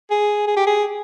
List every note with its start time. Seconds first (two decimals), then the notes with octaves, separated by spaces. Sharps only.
0.11 G#4
0.47 G#4
0.57 G4
0.67 G#4